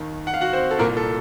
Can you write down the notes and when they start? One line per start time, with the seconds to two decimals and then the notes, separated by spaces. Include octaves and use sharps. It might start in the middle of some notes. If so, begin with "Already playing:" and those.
Already playing: D#2 D#3
0.27 F#5
0.34 F5
0.41 F#4 F#5
0.53 C4 C5
0.71 A4
0.79 C2 A#2 A#3 A#4
0.97 A4